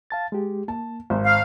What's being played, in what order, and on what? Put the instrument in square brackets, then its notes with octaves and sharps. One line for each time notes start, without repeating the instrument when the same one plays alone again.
[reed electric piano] F5 A5 A6
G#3 G4
[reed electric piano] A#3 [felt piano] A5
[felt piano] G#1 [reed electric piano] C5
[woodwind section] F5